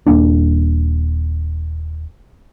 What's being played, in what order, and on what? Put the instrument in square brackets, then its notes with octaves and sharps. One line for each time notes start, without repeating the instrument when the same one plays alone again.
[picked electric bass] D#1 A#3 D4